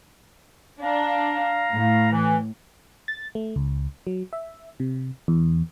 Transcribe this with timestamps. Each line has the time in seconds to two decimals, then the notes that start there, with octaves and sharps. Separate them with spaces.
0.82 D4 F5 A#5
1.72 A2
2.11 E3
3.08 A6
3.35 A3
3.56 C#2
4.07 F#3
4.33 E5
4.80 C3
5.28 E2